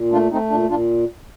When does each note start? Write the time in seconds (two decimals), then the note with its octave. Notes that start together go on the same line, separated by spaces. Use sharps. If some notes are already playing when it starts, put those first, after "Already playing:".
Already playing: A#2
0.12 A3 D4 F4
0.31 A3 C4 D#4
0.50 A#2 D4
0.69 A#2 D4 F4